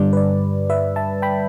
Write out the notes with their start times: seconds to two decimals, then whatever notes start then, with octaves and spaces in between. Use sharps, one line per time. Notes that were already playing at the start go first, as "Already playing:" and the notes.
Already playing: G2 D3 G3 D5
0.13 B4
0.17 D5
0.70 B4 E5
0.96 E5 A5
1.22 G5 B5